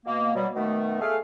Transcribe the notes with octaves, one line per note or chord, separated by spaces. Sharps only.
B2 A#3
B2 F#3 G3
B2 D#3 A3
A3 G#4 F5